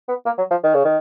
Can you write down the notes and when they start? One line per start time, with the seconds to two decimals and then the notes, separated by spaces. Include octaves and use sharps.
0.08 B3
0.26 A#3
0.38 F#3
0.51 F3
0.63 D#3
0.74 C#3
0.85 D#3